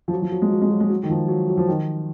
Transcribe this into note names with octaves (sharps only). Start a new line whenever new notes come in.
F3
F#3
F3
F#3
G#3
F#3
G#3
F#3
G#3
F#3
D#3
F3
F#3
F#3
F3
D#3